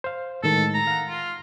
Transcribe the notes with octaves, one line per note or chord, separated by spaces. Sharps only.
C5 F5
A2 D#3 G#3 A4
A#5
F5 F#5
F4